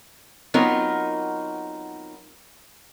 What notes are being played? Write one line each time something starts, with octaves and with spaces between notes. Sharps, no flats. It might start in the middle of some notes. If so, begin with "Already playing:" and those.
F#3 B3 C4 D#4 F4 A#4